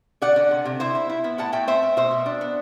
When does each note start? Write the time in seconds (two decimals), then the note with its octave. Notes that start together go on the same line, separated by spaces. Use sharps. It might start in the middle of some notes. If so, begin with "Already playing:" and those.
0.22 D3 D5 F#5
0.36 D3
0.51 C3
0.65 C3
0.80 E4 C5 E5
0.95 E4
1.09 E4
1.24 B3
1.38 A2 F#5 A5
1.52 A2 E5 G5
1.68 C4 C5 E5
1.83 A2
1.97 B2 C5 E5
2.11 B2
2.26 D4
2.41 B3